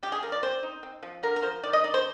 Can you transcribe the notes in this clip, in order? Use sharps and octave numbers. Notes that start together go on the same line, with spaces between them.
F3 G4
G#4
F3 A#4
D5
C4 C5
D#4
C4
F3
D3 A#4
A#4
F3 C5
D#3 D5
D#5
D#4 D5
C5